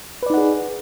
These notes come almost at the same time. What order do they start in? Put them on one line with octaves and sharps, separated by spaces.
B4 D5 D#4 F#5 G#4